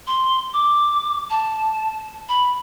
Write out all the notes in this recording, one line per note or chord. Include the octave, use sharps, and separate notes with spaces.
C6
D6
A5
B5